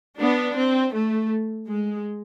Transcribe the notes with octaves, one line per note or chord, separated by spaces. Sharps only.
B3 D4
C4
A3
G#3